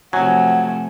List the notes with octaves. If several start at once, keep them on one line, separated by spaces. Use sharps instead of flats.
C3 F3 F#3 A3 F#5 G#5